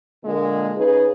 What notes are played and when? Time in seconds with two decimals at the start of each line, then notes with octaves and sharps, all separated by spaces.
0.23 A#2 D3 G#3 A#3
0.76 C#3 D#4 G#4 B4